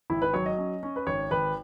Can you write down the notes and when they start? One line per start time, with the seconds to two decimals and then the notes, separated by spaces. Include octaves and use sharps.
0.10 G#1 E4
0.22 B4
0.33 F#3 C#5
0.46 D#5
0.58 C#4
0.83 C#4
0.96 B4
1.07 G#1 C#5
1.31 G#1 B4